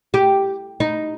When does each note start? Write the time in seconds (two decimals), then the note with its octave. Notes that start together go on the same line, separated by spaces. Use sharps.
0.14 G4
0.80 D#4